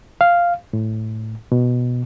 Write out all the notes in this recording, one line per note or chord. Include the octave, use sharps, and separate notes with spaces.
F5
A2
B2